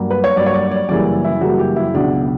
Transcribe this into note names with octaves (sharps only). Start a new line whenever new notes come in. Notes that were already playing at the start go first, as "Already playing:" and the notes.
Already playing: G2 F#3 A#3
B4
C#5
G2 F#3 A#3 D5
C#5
D5
D5
F#2 C#3 E3 G3 A#3 D5
E4
F#2 C#3 E3 G3 A#3 F#4
G4
E4
C#2 B2 F#3 D4